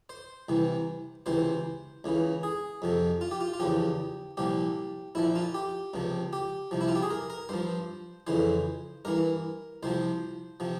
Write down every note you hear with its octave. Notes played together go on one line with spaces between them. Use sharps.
C5
C2 C3 E3
C#2 C3 E3 C5
C#2 C#3 E3
G#4
F2 C3 F3
F4
G4
F4
F4
E2 C#3 F3 G4
C2 A#2 F3 G4
A#1 A#2 F3 E4
F4
G4
C#2 C3 F3
G4
C2 C3 F3
E4
F4
G4
G#4
A#4
A#4
G2 F3 C5
F2 C#3 E3 C5
G2 E3 A#4
C2 C3 F3 C5
C3 F3